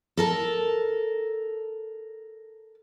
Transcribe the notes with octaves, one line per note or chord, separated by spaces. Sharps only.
A4 A#4 A5